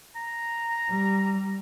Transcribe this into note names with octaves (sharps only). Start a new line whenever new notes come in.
A#5
G3